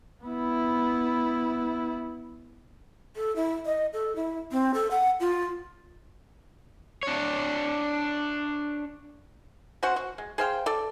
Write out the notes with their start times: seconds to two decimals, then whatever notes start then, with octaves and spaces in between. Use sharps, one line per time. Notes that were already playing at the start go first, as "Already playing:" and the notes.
0.23 B3 E4
3.16 A4
3.36 E4
3.66 D#5
3.93 A4
4.16 E4
4.52 C4
4.74 A4
4.91 F#5
5.20 F4
7.03 D4 C#5
9.83 C#4 F#4 C5 F#5
9.96 F#4
10.18 G#3
10.38 G#4 C5 F5 G5
10.66 A4 D5